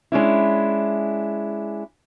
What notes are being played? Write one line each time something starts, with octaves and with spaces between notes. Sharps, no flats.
G#3 C#4 D4 E4